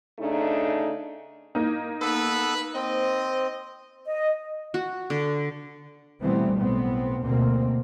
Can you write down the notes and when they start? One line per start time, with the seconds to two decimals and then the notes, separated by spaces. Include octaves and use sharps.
0.19 C#3 A3 D4 D#4
1.55 A#3 D#4
2.01 B3 A4 B4 E6
2.75 C4 C5 D#5
4.06 D#5
4.74 F#4
5.10 D3
6.22 B2 E3 G3 A3 B3 C4
6.58 B1 A2 B3 C4
7.23 D2 B2 A#3 C4